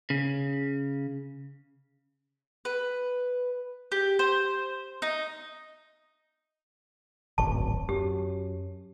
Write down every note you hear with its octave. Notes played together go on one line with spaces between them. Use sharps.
C#3
B4
G4
C5
D#4
D1 G#1 F#2 A5 C#6
F#2 G4